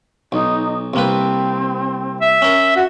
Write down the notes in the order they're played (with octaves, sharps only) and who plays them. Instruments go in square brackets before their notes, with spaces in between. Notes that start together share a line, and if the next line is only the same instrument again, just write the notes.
[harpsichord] B1 [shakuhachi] D#4
[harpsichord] C2 A#3 B4 [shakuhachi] C4
[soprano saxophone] E5
[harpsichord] C#4 A#4
[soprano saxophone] F#4